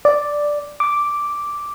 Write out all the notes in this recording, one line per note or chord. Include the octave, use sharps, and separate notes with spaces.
D5
D6